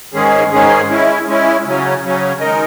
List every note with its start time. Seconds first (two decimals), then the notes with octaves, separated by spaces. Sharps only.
0.13 G#2 D#3 G#3 C#4 G#4
0.51 G#2 D#3 G#3 C#4 G#4
0.89 G#3 C#4 E4
1.27 G#3 C#4 E4
1.64 C#3 F#3 C#4
2.02 C#3 F#3 C#4
2.40 D#3 G#3 D#4 A#4 D#5